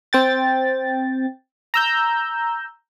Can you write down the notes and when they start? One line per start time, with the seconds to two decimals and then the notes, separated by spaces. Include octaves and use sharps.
0.13 C4 G5 A6
1.74 A#5 E6 G6